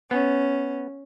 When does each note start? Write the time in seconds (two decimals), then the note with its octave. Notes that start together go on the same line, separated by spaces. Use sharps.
0.11 B3 C#4